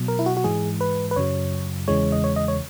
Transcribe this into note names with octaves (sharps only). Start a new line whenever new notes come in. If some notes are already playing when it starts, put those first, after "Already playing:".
Already playing: B2 F#3
A#4
E4
F#4
F#4
G#2 E3 G#3 G#4
B4
B4
F#2 C#3 F#3 C#5
E2 C#3 E3 G#3 C#5
D#5
C#5
D#5
C#5